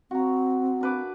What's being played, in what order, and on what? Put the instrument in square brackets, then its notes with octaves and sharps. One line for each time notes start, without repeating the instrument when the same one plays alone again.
[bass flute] C4 [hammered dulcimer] F#4 A#5
[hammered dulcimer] D4 B4 D6